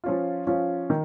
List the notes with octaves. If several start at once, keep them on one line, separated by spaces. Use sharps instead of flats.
F3 C#4 F4
F3 C#4 F4
D#3